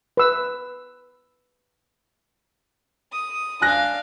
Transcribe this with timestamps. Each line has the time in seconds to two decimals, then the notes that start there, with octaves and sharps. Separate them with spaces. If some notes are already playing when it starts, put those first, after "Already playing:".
0.17 B4 E6
3.12 D#6
3.61 D4 F5 G#5 F#6 A#6